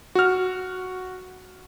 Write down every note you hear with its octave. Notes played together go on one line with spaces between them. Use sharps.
F#4 F6